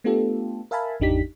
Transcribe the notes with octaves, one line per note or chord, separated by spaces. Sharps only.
A3 B3 D4 F4 G4 A4
A#4 E5 F5 G#5 A5 B5
G#1 E2 D4 D#4 G4 B6